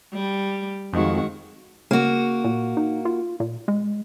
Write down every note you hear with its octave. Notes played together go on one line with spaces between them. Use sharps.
G3
F2 D#3 G#3 F#4
C#3 A#3 F#4
A#2
D#4
F4
A#2
G#3